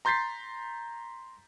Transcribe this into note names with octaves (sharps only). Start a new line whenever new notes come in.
A#5 C6 G6 A6 B6 C7